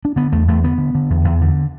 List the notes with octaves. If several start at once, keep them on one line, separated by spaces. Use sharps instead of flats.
D4
D3 B3
E2 A3
E2 A3
D3 B3
D3
D3
E2
E2
D3